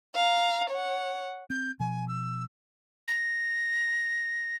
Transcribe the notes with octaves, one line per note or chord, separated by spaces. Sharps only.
F5 A#5
C#5 F#5
C4 G6
B2 F3 G#5
E6
A#6